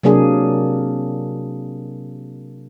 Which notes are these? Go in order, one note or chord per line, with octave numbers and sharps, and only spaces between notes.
C3 F#3 A#3 D4 G#4